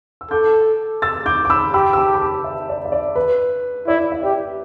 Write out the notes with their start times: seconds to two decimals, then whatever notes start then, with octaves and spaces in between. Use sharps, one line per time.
0.21 E6
0.31 A4 D6 G6
1.02 E6 A6
1.26 D6 G6
1.45 D6
1.50 B5 E6
1.73 G4 B5 E6
1.93 E6
1.97 A5 D6
2.14 B5
2.21 A5 D6
2.44 E5 A5
2.69 D5
2.85 E5
2.92 D5
3.16 B4
3.87 E4 D5
4.12 E5
4.22 G4 D5